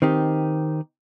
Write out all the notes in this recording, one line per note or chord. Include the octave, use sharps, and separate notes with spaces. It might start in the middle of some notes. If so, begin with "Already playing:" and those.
D#3 C4 D#4 G4